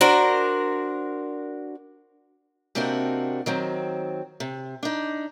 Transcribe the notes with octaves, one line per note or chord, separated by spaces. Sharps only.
D4 F#4 A#4 C5
C3 A#3 C4 D4 D#4 F#4
D#3 F#3 C4
C3
D4 D#4